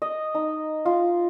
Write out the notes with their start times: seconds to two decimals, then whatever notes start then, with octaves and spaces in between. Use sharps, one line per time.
0.02 D#5
0.35 D#4
0.85 F4